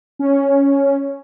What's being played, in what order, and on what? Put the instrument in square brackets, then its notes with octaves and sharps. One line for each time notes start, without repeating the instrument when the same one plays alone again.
[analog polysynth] C#4